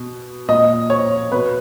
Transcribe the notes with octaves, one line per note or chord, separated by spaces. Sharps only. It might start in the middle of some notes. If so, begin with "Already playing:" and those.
Already playing: B2
A#2 D#5
C#5
B2 B4